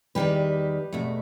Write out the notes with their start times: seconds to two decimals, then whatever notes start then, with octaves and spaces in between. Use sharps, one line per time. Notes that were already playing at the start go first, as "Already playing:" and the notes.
0.15 E2 D#3 G3 G4 B4
0.93 E2 B2 A3